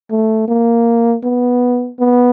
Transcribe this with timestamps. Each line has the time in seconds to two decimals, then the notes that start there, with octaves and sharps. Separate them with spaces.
0.11 A3
0.48 A#3
1.24 B3
2.00 B3